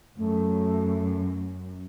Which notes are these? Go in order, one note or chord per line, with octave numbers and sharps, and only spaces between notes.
F#2 A3